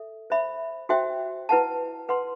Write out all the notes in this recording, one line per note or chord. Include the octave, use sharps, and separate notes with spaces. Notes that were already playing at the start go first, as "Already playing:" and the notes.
Already playing: A4 E5
C5 E5 B5
F#4 C5 E5 G5
E4 B4 F#5 A5
B4 F#5 C6